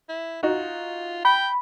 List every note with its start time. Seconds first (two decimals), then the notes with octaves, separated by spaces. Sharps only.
0.09 E4
0.43 D#4 F4 F#4
1.25 G5 B5